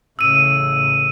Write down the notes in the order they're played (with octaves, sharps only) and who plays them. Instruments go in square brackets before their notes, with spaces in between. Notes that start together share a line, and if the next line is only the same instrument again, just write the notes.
[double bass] A1 C#3 [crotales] E6 D#7